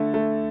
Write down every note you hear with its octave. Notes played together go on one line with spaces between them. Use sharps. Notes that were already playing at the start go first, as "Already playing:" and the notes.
Already playing: D3 A3
A3